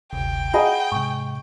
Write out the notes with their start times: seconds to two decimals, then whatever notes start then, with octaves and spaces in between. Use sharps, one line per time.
0.13 G1 D2 C3 G5
0.54 F4 G#4 D#5 F#5 A#5 B5
0.92 G#2 C3 C#6